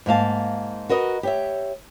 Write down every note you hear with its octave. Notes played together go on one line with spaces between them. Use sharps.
G#2 A#3 F5 A5
F#4 A#4 B4 D#5
G4 C#5 E5